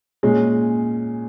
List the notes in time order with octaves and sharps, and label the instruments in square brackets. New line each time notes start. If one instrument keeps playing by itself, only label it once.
[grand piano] A#2 G#3 C#4 G#4